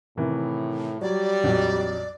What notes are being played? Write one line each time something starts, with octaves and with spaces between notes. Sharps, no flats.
A2 C3 D#3 E3
F#3 G3 D5
A#1 F2 F#3